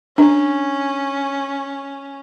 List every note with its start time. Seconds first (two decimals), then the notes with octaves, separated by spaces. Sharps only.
0.18 C#4 D4